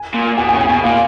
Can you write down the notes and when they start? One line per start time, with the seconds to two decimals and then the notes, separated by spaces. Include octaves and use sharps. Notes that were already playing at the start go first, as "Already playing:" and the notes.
Already playing: G#5
0.14 A#2
0.38 B2 G#5
0.49 G#5
0.53 C#3
0.61 G#5
0.69 B2
0.84 A#2 F5